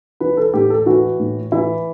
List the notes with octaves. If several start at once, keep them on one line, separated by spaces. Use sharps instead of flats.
E3 B4
A4
A2 G4
A4
E3 F#4
A2
E3 E4